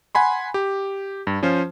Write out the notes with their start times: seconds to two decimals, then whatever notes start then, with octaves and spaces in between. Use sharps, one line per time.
0.15 F#5 G#5 B5 C6
0.54 G4
1.27 G2
1.43 F3 C#4 F4 C5